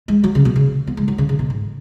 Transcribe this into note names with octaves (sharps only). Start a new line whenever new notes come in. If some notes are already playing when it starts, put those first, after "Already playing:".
G#3
F#3
C#3
B2
C#3
B3
G#3
F#3
C#3
C#3
B2
G#2